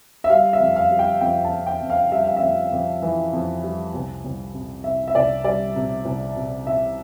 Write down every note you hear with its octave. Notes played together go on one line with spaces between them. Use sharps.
E5
G3 F5
E5
F2
F5
G3
G5
F2 G5
G5
A5
F2
G5
F2
F5
G3 E5
F5
E5
F2
F2
E3
F2
G3
C2
C2
C3
C3 E5
E5
C2 D5
G3 D5
C3
C2
C3
C3 E5